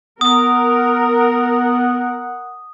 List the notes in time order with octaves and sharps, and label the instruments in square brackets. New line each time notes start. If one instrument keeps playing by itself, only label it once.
[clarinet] B3 [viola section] A#4 [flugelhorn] F#5 [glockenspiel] D#6